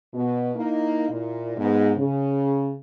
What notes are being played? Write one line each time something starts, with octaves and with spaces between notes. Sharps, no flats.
B2
A#3 D#4 E4
A#2 E4
G#2 B3
C#3